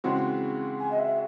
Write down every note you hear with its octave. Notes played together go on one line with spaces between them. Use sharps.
C#3 E3 G#3 C4 F#4
G#5
D#5
E5